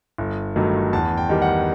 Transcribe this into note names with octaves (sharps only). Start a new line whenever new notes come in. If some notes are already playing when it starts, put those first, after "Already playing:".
G1
G2 D#3 F#3 A3
E2 A5
G5
D#3 G3
F#5